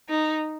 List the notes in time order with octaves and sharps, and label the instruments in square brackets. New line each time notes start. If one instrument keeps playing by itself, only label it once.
[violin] D#4